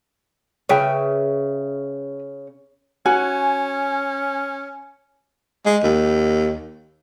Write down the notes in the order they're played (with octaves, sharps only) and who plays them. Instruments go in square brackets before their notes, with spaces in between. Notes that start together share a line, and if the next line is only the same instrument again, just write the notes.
[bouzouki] C#3 [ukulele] B4 E5 G5
[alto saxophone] C#4 [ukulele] F#4 [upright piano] G#5
[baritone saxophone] G#3
D#2